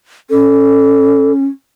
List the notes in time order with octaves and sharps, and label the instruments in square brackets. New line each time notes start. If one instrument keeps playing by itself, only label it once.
[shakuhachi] C#4 [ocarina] A4